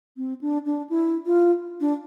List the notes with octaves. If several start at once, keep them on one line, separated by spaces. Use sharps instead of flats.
C4
D4
D4
E4
F4
D4